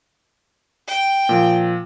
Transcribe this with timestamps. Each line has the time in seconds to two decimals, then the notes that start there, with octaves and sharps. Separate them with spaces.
0.88 G5
1.29 A#2 F3